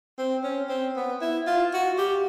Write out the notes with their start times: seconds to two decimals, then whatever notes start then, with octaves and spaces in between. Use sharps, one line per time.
0.18 C4
0.44 C#4
0.69 C4
0.96 B3
1.21 E4
1.47 F4
1.74 F#4
1.98 G4